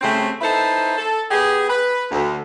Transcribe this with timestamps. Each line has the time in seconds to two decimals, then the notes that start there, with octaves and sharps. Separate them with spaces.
0.01 C#3 G3 A3 C4
0.41 D#4 E4 A4 B4 C5
0.98 A4
1.31 B3 G4 G#4
1.69 B4
2.11 D2